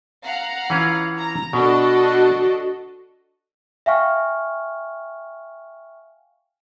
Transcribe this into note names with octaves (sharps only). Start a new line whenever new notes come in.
F5 F#5 A#5
E3 C#4 F4
A#5
B2 D4 F#4 A4 D#5
E5 F5 G5 G#5 C#6 F6